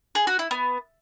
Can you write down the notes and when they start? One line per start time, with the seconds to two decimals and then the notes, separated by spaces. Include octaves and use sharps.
0.15 G#4
0.27 F#4
0.39 E4
0.51 B3